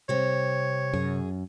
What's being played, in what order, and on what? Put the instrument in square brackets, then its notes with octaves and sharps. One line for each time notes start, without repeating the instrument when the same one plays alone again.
[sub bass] C3 [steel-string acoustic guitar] G3 C4 [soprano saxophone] C#5
[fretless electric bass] F#2 [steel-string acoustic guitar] G#4